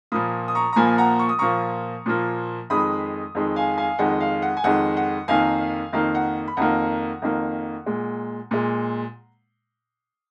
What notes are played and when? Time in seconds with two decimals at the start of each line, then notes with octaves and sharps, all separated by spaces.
0.12 A#2 F3 A#3 B5 D#6
0.48 D#6
0.55 A#5 C#6
0.73 A#5
0.76 A#2 F3 A#3 G#5 B5
0.98 F#5 A#5
1.19 C#6
1.29 D#6
1.39 A#2 F3 A#3 A#5 C#6
2.06 A#2 F3 A#3
2.70 F2 D#3 G#3 B5 D#6
3.35 F2 D#3 G#3
3.56 F5 G#5
3.78 F5 G#5
3.99 F2 D#3 G#3 F#5
4.20 F5
4.42 F#5
4.57 G#5
4.64 F2 D#3 G#3 F#5
4.97 F#5
5.28 F2 D#3 A#3 F5 G#5
5.92 F2 D#3 A#3 F5
6.15 F#5
6.48 B5
6.57 F2 D#3 A#3 F#5 A#5
7.22 F2 D#3 A#3
7.86 A#2 G#3
8.51 A#2 G#3